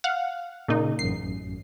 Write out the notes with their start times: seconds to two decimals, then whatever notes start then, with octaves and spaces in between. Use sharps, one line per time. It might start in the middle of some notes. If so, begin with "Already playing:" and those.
0.04 F5 F#5
0.68 A#2 C#3 D#4
0.99 A1 F#2 C7